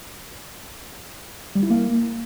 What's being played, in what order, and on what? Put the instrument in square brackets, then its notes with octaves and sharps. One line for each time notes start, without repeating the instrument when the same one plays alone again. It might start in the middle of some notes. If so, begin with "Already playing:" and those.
[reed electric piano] G3
E4
A#3